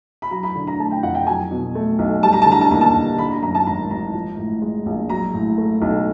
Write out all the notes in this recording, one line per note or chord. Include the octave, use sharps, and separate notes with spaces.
B5
F#3 A#5
B5
D3
A#5
A3 A5
G5
F2 F#5
G5
F#3 G#5
B2
A3
B1
G3 A5
A#5
D3 A5
A#5
A5
D#2 A#5
A5
D#2
D3 B5
A#5
F#2 A#5
A5
G#1 A#5
G#1 A#5
F3
A2
G#3
A#1
F#3 A#5
A2
A3
B1